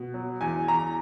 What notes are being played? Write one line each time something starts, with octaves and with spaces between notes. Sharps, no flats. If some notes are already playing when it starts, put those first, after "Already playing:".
Already playing: B2
F#3
E2 G#5
E2 A#5